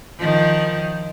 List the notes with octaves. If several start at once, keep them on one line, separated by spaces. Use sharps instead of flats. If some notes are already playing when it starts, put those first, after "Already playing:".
D#3 F3